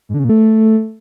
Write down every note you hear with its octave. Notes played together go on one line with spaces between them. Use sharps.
G#2
D3
C#3
A#2
A3